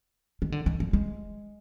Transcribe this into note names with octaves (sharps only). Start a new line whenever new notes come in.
D#3
D3
D#3
F3
G#3